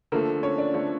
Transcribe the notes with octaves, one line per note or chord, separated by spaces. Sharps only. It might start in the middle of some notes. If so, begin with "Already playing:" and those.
D3 F3 A3 A#3 A#4
C#4 C#5
D4 D5
D3 F3 A3